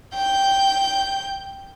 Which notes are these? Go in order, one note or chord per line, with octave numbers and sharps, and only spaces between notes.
G5 G6